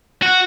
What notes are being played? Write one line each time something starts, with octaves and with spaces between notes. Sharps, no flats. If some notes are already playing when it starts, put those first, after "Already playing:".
F#4